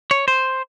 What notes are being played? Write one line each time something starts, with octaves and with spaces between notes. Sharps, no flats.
C#5
C5